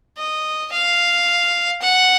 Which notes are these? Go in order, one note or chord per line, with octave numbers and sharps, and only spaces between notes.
D#5
F5
F#5